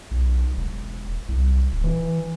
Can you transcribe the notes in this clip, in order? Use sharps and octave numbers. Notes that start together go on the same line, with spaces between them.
B1
E1
C2
D1
E3